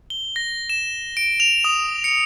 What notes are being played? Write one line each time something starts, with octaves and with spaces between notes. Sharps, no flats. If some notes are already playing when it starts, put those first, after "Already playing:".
G7
A#6
E7
D7
F7
D#6
C#7